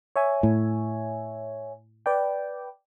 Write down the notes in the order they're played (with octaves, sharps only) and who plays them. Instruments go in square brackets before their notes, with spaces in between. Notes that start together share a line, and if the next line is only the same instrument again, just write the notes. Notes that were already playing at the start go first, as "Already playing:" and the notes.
[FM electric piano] C#5 E5 G#5
[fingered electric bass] A2
[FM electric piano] B4 D5 G5